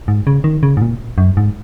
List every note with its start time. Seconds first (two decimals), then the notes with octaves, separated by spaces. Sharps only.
0.08 G#2
0.27 C#3
0.44 D#3
0.63 C#3
0.77 G#2
0.82 A#2
1.18 F#2
1.37 G#2